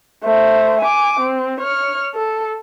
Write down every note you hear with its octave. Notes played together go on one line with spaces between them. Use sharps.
A3 C5
G#5 D6
C4
C#5 F6
A4